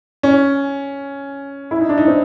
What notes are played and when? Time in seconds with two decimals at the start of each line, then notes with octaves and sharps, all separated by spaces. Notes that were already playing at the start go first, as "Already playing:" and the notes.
0.23 C#4
1.71 E4
1.81 D#4
1.89 D4
1.98 D#4
2.08 C4